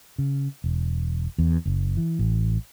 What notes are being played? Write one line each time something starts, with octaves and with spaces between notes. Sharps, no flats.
C#3
E1
E2
F#1
E3
A1